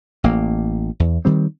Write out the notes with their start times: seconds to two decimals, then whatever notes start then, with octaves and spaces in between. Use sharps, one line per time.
0.24 A1 A#3
1.00 E2
1.25 D#3 G3 C4